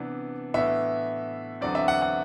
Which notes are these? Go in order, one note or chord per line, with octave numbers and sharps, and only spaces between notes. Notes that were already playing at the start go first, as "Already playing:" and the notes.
Already playing: C3 E3 B3 D4
A2 E3 B3 D4 E5
E2 D3 F#3 C4 D5
E5
F#5
F#5